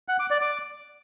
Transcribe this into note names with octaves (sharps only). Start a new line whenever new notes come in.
F#5
D6
D5
D6